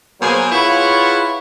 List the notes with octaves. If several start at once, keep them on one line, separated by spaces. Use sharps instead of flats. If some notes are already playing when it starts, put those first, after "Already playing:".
B2 F#3 A#3 G#4 C5 G#5
E4 F4 G#4 B4 C#5 F#5